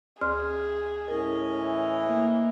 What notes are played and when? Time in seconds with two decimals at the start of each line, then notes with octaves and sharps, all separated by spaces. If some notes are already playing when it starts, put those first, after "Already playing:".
0.21 D2 G#4 C6 F6
1.08 A2 C#4 A#4 D#5
1.58 E3
2.05 A#3